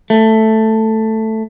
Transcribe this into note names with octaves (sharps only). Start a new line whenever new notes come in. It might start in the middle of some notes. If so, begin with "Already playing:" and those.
A3